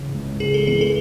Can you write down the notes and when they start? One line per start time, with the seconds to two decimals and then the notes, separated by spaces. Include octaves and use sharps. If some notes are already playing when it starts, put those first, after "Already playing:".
Already playing: C#3 E3
0.13 C#2
0.40 C#2 G#4
0.54 A4
0.67 E3 G#4
0.81 A4